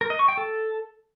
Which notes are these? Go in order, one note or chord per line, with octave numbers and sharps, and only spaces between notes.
A#4
D#5
C#6
G5
A4